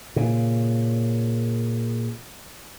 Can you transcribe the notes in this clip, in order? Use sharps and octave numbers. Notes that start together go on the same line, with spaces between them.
A#2 C#3